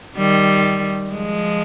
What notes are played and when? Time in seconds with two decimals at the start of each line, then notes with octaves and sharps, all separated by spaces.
0.17 D#3 G3
1.13 F3 G#3